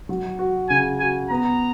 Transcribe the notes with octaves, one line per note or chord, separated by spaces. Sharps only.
F#3
F#4
C#3 G#5
F#4 G#5
B3 A#5